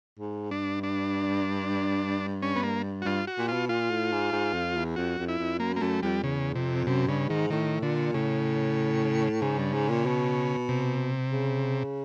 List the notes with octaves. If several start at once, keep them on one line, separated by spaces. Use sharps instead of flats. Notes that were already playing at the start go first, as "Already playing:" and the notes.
G#2
G2 D4
D4
C#4
B3
A#3
F#4
G2 F4
F#4
A#2
B2 F4
A#2 F4
A2
G#2
G#2
F2
E2
F2 F#4
F2
E4
F2
F#2 A#3
A#3
F#2 A3
F2 G3
E2 C#3
F2 C3
F#2 C3
G2 C#3
G#2 D#3
A2 D#3
A#2 D3
A2 C#3
G#2 C#3
G2
G#2
A#2
B2
C3
C#3